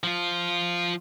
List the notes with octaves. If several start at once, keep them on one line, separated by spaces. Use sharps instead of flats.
F3 F4